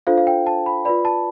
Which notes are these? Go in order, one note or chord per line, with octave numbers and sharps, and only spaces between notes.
D4 F4 A4 C5 F5
F5
G5
A5
B5
F4 B4 D5 B5
A5